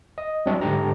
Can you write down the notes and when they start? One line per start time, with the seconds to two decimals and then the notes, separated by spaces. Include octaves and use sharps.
0.18 D#5
0.46 F#3 G3 C4 D4 D5 E5
0.61 G#2 D3 D4 G4 A#5